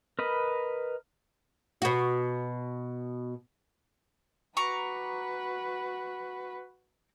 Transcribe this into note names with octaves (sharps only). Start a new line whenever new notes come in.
A#4 B4 D#5 B5
B2 F#4
F#4 B4 A#5 C#6 D6